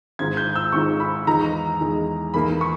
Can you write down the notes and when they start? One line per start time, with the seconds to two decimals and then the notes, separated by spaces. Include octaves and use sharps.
0.19 G#1 G#2 D#3 G#6
0.37 G6
0.55 E6
0.72 G#1 G#2 D#3 C#6
1.00 B5
1.27 E2 D#3 G#3 A#5
1.81 E2 D#3 G#3
2.34 E2 D#3 A#3 B5
2.61 C#6